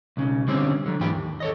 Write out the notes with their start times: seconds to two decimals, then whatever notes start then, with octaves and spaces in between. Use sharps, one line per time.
0.17 B1 C#3
0.48 D3 G3 C4 C#4
0.86 D3 F#3
1.01 G#2 E3 G4 G5 B5
1.15 D#2
1.40 A4 C#5 D#5